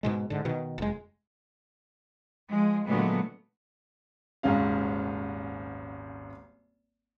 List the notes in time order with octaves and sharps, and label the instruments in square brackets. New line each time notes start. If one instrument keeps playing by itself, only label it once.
[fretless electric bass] G#2 B2 G#3
G#2 D3
B2 D#3
F1 G#3
[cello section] F3 G#3
A#2 D3 F#3 G#3 A3 B3
[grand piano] D#1 G#1 G#2 C#3 C#4 F5